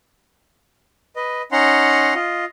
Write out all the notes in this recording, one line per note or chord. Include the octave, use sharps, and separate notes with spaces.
B4 D#5
C#4 D#4 F#5 A#5 C6
F4 D#5